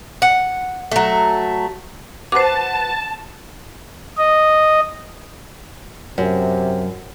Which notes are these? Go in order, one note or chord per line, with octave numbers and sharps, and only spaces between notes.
F#5
F#3 A3
F#4 B4 C5 A5 D6
D#5
F#2 C3